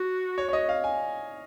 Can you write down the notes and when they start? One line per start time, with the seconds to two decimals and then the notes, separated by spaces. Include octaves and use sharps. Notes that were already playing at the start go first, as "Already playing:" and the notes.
Already playing: F#4
0.38 C#5
0.49 C#5
0.53 D#5
0.69 F5
0.84 G#5